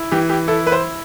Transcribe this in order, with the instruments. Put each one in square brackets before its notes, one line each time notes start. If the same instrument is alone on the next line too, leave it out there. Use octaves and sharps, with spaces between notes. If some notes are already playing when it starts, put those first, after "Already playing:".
Already playing: [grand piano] E4
[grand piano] E3 [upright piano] G4
[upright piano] G4
[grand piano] E4 [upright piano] A4
[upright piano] B4
C5